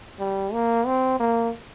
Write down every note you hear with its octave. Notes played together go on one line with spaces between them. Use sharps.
G3
A#3
C4
A#3